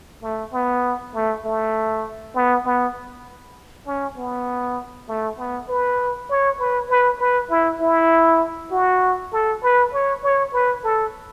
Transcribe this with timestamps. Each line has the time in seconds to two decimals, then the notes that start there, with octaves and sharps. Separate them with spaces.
0.23 A3
0.53 B3
1.14 A3
1.44 A3
2.35 B3
2.65 B3
3.87 C#4
4.17 B3
5.08 A3
5.38 B3
5.69 B4
6.30 C#5
6.60 B4
6.90 B4
7.20 B4
7.50 E4
7.81 E4
8.71 F#4
9.32 A4
9.63 B4
9.93 C#5
10.23 C#5
10.53 B4
10.84 A4